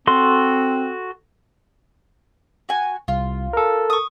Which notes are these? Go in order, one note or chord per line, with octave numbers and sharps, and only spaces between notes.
C4 F#4 A4 C6
F#4 G#5
C2 F4
A4 A#4
C#6 D#6